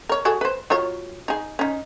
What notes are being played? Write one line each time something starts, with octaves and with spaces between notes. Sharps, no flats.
A#4 C#5
F#4 G#4 A4
B4 C5
F#3 F4 C#5
D#4 G#4
C#4 D#4